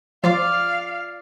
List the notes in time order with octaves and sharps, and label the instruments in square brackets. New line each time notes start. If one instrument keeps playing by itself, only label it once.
[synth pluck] F3 [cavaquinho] F4 D5 D6 [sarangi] F5